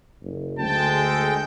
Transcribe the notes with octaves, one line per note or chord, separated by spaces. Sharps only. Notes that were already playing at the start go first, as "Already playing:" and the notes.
F#1
D2 G#3 G5 A5
A4